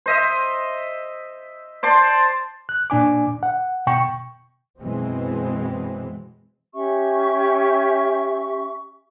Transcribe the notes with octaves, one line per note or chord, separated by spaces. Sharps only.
C5 D#5 E5
C5 D5 A5 C6
F#6
A#2 D4 G#5 D6
F#5
B2 G5 C#6
F#2 B2 E3 G#3 C4
C#4 G4 E5 C#6